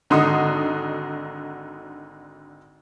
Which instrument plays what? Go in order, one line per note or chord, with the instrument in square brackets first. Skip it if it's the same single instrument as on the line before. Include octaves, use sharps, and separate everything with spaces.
[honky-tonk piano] G#1 D3 D#4 F#4 C6 D#6